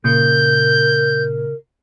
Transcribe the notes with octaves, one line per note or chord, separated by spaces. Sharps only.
A#2 C#3 A#4 G6